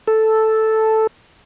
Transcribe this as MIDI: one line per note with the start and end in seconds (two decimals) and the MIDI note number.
0.07 1.07 69